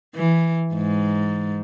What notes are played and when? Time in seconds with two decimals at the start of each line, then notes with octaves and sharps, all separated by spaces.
0.15 E3
0.74 G#2